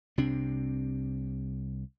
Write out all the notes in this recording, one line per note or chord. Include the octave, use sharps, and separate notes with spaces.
C2 C3 C4 D4